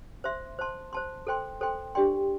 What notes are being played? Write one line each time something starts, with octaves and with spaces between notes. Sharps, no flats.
C5 E5 C6
C5 A5 C6
C5 A5 C6
A4 C5 G5 C6
A4 C5 G5 C6
D4 G4 D5 G5 C6